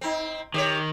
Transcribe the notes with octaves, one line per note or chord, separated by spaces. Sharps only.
C4 D#4
D#3 G4 C5 C#5